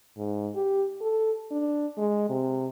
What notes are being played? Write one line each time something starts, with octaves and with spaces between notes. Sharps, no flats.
G#2
G4
A4
D4
G#3
C3